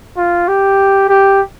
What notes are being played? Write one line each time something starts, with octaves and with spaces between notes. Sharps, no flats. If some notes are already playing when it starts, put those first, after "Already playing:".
F4
G4
G4